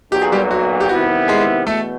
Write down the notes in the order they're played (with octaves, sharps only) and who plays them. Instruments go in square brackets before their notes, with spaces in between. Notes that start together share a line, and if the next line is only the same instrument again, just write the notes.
[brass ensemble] B1 A#2 F#3 [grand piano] G4
[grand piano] G#4
G3 G4
F#4
G4
[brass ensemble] C3 D#3 G3 B3 E4 [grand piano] F#4
[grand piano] G#3 G#4
[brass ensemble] E2 B2 [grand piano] A3 A4